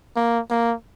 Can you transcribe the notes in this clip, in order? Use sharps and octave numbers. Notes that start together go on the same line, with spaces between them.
A#3
A#3